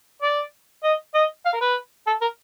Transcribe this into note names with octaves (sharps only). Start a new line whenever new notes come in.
D5
D#5
D#5
F5
A#4
B4
A4
A#4